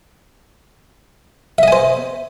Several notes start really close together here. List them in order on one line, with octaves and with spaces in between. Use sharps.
E5 D#5 G#5 C5